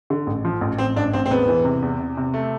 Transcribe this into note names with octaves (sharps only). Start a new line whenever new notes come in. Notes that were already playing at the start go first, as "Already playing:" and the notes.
D3
A1
F3
A1
A1 C4
A1 D4
A1 C4
C4
E1 B3
E3
C3
E2
C3
C3
A3